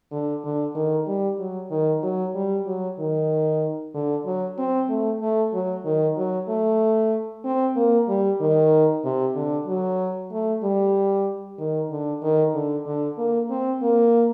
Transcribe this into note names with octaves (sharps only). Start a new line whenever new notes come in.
D3
D3
D#3
G3
F#3
D#3
F#3
G3
F#3
D#3
D3
F#3
C4
A3
A3
F#3
D#3
F#3
A3
C4
A#3
G3
D#3
C3
D3
F#3
A3
G3
D#3
D3
D#3
D3
D3
A#3
C4
A#3